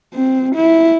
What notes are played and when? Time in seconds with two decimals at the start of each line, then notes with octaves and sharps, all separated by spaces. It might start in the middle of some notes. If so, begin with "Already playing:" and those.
0.14 C4
0.55 E4